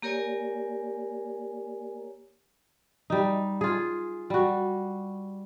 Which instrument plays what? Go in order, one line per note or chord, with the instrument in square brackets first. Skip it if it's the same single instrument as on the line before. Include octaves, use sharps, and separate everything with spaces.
[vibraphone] A#3 G4 A#4 C#5 D5 G#5
[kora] G3 D#4
F4 G#4
G3 F#4